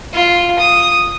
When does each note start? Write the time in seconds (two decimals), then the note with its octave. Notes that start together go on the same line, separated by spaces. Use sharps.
0.13 F4
0.59 D#6